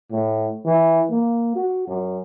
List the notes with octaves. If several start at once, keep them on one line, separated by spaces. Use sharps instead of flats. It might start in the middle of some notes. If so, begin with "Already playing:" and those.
A2
E3
A#3
F#4
F#2